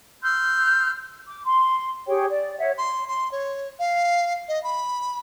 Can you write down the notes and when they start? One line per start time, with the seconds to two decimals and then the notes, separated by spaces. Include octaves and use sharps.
0.23 C6 E6 F6 G6
1.27 D6
1.45 C6
2.07 G4 G#4 C#5 G5
2.29 D5
2.59 C#5 E5 F#5
2.78 C6
3.08 C6
3.32 C#5
3.79 F5
4.49 D#5
4.64 B5